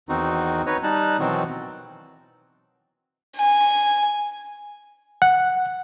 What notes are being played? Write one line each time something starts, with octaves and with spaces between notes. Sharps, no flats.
E2 D#3 C4 D#4 F#4
D#4 B4 C#5 D#5
G3 D#4 A5 F#6
B2 D#3 E3 F#3 C4 F#4
G#5
F#5